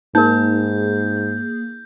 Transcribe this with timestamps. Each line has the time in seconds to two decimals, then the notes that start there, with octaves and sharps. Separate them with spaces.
0.15 G#2 A#3 D#4 G#4 A#4 G6